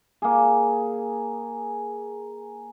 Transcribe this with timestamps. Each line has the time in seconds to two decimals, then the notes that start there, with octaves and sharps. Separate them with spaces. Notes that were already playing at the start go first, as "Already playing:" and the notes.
0.22 A#3 G#4